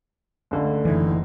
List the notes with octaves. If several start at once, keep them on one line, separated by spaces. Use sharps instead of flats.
C#2 D3 A3
F#1 E3 D#4